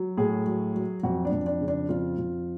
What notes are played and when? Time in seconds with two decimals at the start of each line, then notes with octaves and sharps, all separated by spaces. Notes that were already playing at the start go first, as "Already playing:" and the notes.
Already playing: F#3
0.17 A2 G#4
0.46 F#3
0.74 F#3
1.03 F2 F#4
1.25 D4
1.32 F2
1.47 D4
1.61 C#3
1.68 D4
1.89 F2 F4
2.18 F2